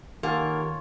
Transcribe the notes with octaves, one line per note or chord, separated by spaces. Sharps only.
D#3 A#3 F4 G4 A4 C#5 F#5 G#5